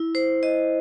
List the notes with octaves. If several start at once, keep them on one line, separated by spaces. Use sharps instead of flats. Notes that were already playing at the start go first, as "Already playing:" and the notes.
Already playing: E4
C5
D#5